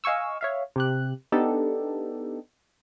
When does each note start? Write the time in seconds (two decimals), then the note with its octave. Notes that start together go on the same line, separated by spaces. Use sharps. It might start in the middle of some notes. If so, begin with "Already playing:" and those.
0.04 D#5 F5 G#5 C#6 E6
0.41 C#5 E5 F5
0.76 C3 G4 F#6
1.32 B3 D4 D#4 G4 A4